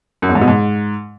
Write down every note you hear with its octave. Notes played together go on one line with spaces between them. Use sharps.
F#2
E2
G#2
B2
G#2